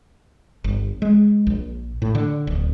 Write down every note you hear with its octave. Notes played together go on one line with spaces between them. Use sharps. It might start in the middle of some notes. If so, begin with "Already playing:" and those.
G1
G#3
A#1
A2
D3
D1